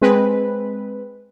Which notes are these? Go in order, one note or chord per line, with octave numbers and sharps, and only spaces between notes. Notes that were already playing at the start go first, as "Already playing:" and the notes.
G#3 C4 B4